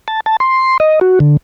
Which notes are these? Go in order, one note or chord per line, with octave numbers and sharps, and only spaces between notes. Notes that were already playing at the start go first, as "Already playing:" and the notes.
A5
A5
C6
D#5
F#4
D3